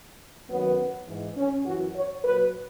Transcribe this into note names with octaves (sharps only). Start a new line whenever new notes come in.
F#2 D#3 F#3 B3
G#2 E3
C#4
F#2 E3 F#4
C#5
A#2 F#3 B4